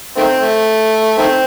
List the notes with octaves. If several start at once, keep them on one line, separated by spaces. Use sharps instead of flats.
D#3 A3 C4
A3
D#3 A3 C4